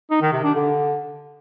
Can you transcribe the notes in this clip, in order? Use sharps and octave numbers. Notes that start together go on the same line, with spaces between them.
D#4
D#3
C3
D4
D3